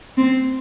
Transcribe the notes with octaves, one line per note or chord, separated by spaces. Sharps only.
C4